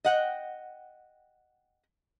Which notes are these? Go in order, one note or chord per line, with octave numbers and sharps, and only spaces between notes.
D#5 F#5 G5